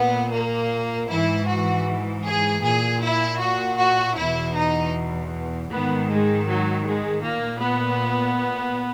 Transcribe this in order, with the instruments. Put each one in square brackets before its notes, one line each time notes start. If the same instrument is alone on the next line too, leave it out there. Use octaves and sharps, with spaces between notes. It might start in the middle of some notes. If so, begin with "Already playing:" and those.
Already playing: [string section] A#2 B3
A#3
G#2 E3 E4
F#4
G#4
A#2 G#4
E4
F#4
F#4
E2 B2 E4
D#4
G#2 D#3 B3
G#3
F#3
G#3
A#2 A#3
B3